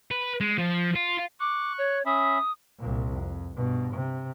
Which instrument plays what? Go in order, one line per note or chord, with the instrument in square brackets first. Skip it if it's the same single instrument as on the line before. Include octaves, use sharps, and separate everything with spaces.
[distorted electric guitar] B4
G#3
F3
F4
[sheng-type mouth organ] C#6 F#6 [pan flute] D6
[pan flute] C#5
[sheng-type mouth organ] C#4 E5 B5 [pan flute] D#6
[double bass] C2 A#2
F2
G2 B2
C3